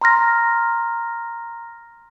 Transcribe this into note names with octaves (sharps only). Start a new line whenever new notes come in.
A#5 C6 F6 A#6